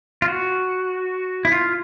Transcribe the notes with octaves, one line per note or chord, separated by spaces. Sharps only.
F4
F#4
E4
F4